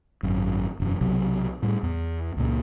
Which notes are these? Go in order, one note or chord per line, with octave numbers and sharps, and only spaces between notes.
G#1 F#2
E1 F#2
B1 C3 F#3
A2 G3
E2
C#2 A#2